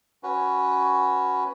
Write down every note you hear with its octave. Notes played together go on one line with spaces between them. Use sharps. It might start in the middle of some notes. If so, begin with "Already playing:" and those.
C#4 F#4 B4